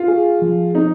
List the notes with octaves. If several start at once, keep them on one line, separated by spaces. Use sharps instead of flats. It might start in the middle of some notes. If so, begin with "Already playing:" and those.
Already playing: F4 F5
G#4
F3
C4 D#4